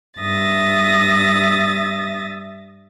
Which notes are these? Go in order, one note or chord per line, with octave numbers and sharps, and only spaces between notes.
G2 E5 D#6 A6 A#6